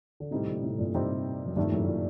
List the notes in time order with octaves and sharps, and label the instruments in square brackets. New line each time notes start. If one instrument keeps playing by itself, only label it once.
[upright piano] D3
[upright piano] A2 C3 [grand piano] G3 C4 D#4
[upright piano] A#2 D3
A2 C3
G2 A#2
[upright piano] G2 [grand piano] C3 G3 C4 D#4 G4
[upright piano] F#2
[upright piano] G2 [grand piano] C3 D#3 A3
[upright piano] A#2
F#2 A2
A#2